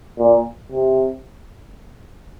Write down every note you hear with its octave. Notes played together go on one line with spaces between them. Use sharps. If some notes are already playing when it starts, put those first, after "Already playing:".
A#2
C3